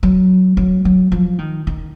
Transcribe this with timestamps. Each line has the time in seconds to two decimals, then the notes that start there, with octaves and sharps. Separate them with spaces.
0.03 F#3
0.57 F#3
0.85 F#3
1.12 F3
1.39 D#3
1.67 D#3